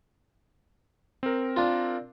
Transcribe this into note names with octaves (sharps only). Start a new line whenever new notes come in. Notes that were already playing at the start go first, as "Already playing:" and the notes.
C4 A#4
D4 F4